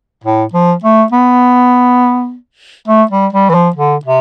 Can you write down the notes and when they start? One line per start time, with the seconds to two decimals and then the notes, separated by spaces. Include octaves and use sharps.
0.24 A2
0.53 F3
0.84 A3
1.12 B3
2.88 A3
3.11 G3
3.33 G3
3.50 E3
3.54 F3
3.76 D3
4.06 C3